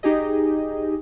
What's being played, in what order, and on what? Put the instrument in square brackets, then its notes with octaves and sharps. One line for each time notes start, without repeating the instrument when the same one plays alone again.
[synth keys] D#4 G4 G#4 D#5